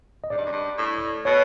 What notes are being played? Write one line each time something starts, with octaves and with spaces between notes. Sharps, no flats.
D#5
G#2 D5
G2
F#2
G2
A2
B2 C#5